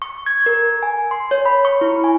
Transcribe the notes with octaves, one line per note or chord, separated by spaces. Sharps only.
C#6
G#6
A#4
G#5
C6
C#5
B5
C#6
E4
G#5